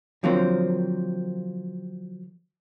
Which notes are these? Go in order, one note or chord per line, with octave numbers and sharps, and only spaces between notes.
D3 F3 F#3 A#3 C4